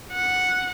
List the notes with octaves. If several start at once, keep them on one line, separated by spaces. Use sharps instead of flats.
F#5